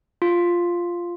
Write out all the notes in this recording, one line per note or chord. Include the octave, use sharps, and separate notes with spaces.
F4